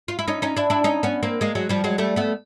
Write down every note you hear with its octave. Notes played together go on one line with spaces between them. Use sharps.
F4
E4
C#4 D#4
C#4 D#4
D4 E4
D4 E4
C#4 D#4
B3 C#4
A#3 C4
G#3 A#3
F#3 G#3
F3 G3
F#3 G#3
G3 A3
A3 B3